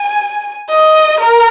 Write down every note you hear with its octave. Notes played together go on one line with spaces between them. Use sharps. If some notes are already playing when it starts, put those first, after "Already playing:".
Already playing: G#5
D#5
A#4